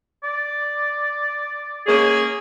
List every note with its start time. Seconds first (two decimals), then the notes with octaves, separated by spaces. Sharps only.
0.23 D5
1.86 A#3 C#4 G#4